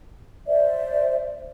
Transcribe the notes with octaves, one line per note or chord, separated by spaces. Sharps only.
C5 D5 E5